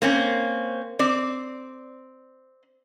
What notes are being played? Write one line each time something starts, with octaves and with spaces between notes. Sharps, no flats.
A#3 C4 C#4
C4 D5